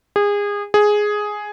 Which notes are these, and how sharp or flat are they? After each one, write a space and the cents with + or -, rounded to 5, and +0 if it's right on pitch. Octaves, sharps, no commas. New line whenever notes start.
G#4 -25
G#4 +5